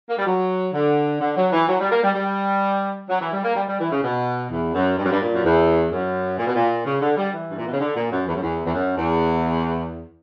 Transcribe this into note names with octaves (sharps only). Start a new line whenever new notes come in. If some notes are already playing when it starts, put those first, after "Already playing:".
A#3
G3
F#3
D3
D3
F#3
E3
F#3
G3
A#3
G3
G3
F#3
E3
G3
A#3
G3
G3
E3
C#3
B2
E2
F#2
G2
F#2
G2
A#2
F#2
E2
F#2
A#2
B2
A#2
C#3
D3
G3
E3
G2
A#2
B2
C#3
D3
A#2
F#2
E2
F#2
E2
E2
F#2
E2